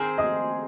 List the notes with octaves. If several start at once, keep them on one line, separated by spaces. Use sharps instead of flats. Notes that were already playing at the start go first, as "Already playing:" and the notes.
Already playing: D#3 C4 G#4 C5
D#5 D#6